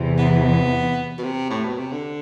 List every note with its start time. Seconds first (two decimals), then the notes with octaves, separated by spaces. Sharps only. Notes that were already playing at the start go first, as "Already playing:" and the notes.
Already playing: E2 C3 E3
0.18 B3
1.18 B2
1.24 C3
1.51 A2
1.65 B2
1.78 C3
1.92 D3